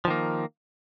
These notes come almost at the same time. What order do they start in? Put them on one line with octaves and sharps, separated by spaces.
F3 D#3 A#3